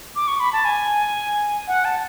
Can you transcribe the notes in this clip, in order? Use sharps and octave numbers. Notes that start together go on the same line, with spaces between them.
D6
C#6
B5
A5
G#5
F#5
A5